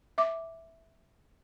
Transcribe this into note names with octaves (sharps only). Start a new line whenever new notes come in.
E5 D6